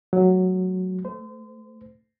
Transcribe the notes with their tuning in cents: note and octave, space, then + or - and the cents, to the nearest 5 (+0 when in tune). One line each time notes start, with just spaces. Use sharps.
F#3 +0 A3 -20
A3 +0 C5 -35